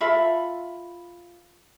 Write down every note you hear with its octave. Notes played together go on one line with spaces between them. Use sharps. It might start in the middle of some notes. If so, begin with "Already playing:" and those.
F4 A4 E5 B5